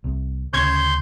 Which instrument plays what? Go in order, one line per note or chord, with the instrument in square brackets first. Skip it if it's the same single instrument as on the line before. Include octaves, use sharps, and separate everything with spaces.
[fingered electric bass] C2
[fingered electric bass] D2 C#3 [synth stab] C#4 C#5 G#6 [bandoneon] C6 G6